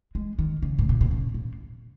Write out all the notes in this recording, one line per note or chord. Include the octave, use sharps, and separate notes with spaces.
G#3
D#3
C#3
G#2
A#2
B2
C#3
A#2